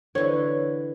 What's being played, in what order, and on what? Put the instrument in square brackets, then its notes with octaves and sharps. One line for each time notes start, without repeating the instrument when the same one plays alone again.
[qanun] D3 E3 [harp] C#5